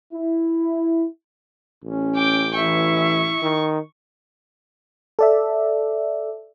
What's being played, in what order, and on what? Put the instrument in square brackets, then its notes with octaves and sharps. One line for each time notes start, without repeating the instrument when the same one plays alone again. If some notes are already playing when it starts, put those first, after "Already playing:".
[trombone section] E4
[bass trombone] A1 [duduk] C#4
[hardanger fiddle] G5 D6
[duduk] E3 [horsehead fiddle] E4 E5 [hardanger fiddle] C#6
[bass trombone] D#3
[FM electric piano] A4 D5 E5